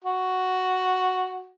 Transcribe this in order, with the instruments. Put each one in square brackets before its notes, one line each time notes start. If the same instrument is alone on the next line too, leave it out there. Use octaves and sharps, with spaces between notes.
[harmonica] F#4